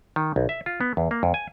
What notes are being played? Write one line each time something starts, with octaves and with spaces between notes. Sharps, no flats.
D#3
B1
E5
F4
B3
E2
A#3
F2
G#5